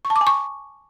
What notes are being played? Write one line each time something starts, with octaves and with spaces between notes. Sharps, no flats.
C#6
A5
D6
G#5
C#6